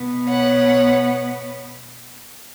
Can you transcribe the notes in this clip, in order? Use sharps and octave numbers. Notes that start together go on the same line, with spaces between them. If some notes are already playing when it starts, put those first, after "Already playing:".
Already playing: B2 B3
C#5 F#5